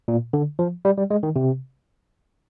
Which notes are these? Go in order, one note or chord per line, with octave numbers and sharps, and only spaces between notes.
A#2
D3
F3
G3
G3
G#3
D#3
C3